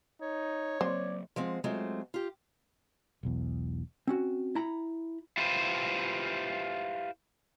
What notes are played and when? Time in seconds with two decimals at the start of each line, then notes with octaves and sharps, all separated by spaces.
0.21 D#4 C#5
0.81 F#3 A#3 C4 C5 D5
1.36 F3 G#3 C4 F#5
1.64 F#3 G#3 A3 C4 F4
2.14 F4 G4
3.23 E1 B1 E2
4.07 C4 C#4 F#4
4.55 E4 A#5 B5
5.38 E4 F4 G4 B4 C5